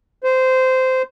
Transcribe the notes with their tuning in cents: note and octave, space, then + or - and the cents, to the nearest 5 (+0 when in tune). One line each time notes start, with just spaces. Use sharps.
C5 -15